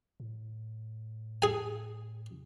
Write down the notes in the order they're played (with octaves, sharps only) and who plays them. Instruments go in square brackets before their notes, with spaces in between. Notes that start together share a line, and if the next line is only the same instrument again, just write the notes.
[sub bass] A2
[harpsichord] G#4 G#5